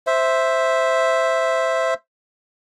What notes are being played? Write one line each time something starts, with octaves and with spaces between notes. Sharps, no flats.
C5 E5